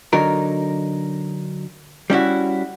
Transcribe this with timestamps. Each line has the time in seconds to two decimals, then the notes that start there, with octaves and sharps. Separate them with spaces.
0.13 D3 F#3 D#4 A#4
2.10 G3 C#4 E4 F#4